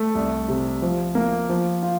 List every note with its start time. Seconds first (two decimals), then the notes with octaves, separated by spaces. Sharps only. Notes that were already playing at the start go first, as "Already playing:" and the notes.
Already playing: A3
0.15 C2
0.48 C3
0.82 F3
1.15 A#3
1.49 F3
1.83 F4